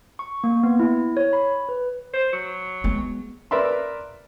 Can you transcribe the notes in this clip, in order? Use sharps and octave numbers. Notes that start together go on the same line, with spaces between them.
C#6
A#3
B3
E4
C#5
B5
B4
C5
F#3
G#3 B3
A#4 B4 D5 E5 B5 C6